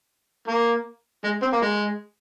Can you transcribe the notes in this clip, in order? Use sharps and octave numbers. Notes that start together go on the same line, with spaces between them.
A#3
G#3
C4
A#3
G#3